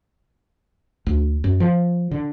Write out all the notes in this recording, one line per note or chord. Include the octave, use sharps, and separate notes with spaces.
D2
F#2
F3
D3